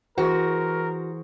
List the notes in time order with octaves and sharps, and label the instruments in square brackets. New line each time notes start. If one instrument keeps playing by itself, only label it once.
[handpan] E3 G#4 C5 [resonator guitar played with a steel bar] F#4 [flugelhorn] A#4